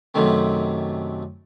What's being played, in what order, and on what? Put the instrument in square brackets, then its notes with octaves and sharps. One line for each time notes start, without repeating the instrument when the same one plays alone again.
[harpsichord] F#2 C3 D#3 A3 C4